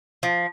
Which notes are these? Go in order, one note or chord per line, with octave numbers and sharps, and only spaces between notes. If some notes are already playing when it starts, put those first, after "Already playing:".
F3